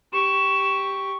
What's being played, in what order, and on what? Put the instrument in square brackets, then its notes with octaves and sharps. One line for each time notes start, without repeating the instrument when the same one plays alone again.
[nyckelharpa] G4 C#6 [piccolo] E7